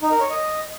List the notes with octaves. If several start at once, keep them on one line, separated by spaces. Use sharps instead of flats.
D#4
A#4
C#5
D#5